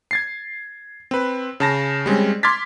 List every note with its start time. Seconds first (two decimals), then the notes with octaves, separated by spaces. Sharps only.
0.11 G#6 A6 C7
1.11 C4 B4
1.60 C#3 A5 A#6
2.06 G3 G#3 C4 C#4
2.43 C6 D6 F6 G#6 A6 B6